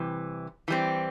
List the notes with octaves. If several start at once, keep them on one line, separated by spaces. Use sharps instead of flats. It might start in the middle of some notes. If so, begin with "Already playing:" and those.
Already playing: C3 E3 G3
E3 G3 C4